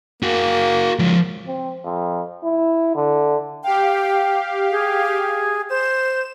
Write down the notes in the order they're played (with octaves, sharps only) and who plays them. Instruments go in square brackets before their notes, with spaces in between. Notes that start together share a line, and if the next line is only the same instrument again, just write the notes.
[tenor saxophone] A#3 [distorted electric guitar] F#4 G#4
[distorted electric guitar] F3 G#3
[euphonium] C4
F2
E4
D3
[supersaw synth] G4 F5 [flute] G5
[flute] G#4
[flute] C5 [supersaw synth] E7